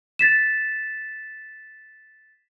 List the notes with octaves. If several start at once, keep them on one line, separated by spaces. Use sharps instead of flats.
A6 B6 E7